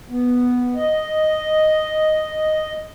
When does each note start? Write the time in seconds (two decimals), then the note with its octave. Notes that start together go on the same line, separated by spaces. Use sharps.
0.10 B3
0.76 D#5